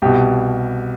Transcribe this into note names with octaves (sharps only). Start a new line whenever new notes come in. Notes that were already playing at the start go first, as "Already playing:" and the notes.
C2 B2 G4